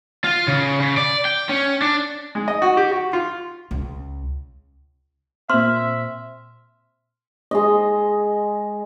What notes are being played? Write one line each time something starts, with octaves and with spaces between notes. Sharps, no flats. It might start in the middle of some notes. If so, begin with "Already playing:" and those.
F4
C#3
C#3
D5
G5
C#4
D4
G#3
D#5
F#4
G4
F#4
F4
C#2
A#2 C4 E5 C6 F6
G#3 D#5